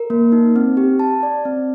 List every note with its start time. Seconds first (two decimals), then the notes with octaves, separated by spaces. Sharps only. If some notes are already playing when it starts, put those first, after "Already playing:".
Already playing: A#4
0.10 A#3
0.32 D#4
0.56 C4
0.77 G4
0.99 A5
1.23 D5
1.45 C4